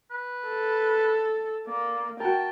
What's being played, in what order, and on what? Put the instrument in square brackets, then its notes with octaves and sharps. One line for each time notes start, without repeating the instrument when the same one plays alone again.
[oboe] B4
[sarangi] A4
[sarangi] A#3 [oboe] D5
[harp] F#4 A#4 [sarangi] G5 [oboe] A5